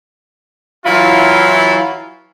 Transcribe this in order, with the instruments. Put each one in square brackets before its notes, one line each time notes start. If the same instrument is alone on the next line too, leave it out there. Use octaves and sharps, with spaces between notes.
[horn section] E3 F#3 E4 F4